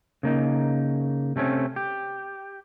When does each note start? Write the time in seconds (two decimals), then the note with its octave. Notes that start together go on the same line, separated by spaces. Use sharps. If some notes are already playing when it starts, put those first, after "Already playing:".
0.23 C#3 A#3 D#4
1.36 C3 A3 C4 C#4
1.76 G4